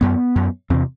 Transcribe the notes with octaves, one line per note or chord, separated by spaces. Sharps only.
F#2 B3
F#2
E2 C3 C4